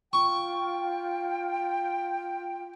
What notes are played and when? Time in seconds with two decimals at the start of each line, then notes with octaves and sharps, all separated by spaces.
0.13 F4 G5 C#6